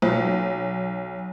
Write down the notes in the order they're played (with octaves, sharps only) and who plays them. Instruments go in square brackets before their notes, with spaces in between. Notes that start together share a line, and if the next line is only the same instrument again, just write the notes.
[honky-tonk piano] B1